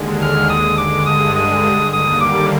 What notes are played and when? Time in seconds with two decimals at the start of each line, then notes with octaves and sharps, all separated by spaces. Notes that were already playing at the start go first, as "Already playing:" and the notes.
Already playing: D#2 D3 G#3
0.22 F6
0.50 D#6
0.77 G2 D3 G#3 D6
1.06 D#6
1.36 D#6
1.92 D#2 D3 G3 A#3 D#6
2.20 D6